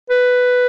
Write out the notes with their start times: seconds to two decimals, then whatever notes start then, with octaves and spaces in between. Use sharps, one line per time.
0.10 B4